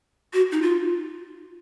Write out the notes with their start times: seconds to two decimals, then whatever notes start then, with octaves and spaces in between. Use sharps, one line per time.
0.33 F#4
0.52 D#4
0.62 F4